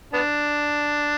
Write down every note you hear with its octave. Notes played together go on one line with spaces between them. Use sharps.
B3 D4